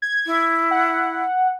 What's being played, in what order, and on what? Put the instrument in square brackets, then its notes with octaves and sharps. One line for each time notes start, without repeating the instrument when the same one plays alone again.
[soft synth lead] G#6
[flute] E4
[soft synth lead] F#5